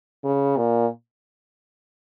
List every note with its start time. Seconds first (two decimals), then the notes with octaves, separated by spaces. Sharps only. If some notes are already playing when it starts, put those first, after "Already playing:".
0.24 C#3
0.57 A#2